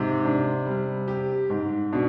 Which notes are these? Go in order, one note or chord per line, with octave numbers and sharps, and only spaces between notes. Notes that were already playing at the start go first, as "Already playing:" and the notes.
Already playing: G#2 C3
D4
G3
G4
G#2
B2 D4